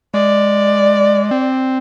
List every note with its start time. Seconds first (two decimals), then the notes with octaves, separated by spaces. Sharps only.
0.14 G#3 D5
1.31 C4